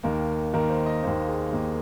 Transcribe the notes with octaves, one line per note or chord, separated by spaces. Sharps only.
D#2 D#3 A#3 A#4
D#2 D#3 A#3 A#4
C5
D#5
D#2 D#3 A#3 C5
G#4
D#2 D#3 A#3